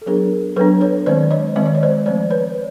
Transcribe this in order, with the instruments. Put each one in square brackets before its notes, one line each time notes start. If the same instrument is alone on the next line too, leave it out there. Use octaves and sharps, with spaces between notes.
[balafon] A4
F#3 B3 D4 G#4 A#4
F#3 A4 B4
B3 D4
B4 C#5
D#3 G#3 C4 C5 D5
C#5 D#5
D#3 G#3 C4 D#5
D5
C#5
C5 D5
F3 A3 C4 C5 D5
B4 C#5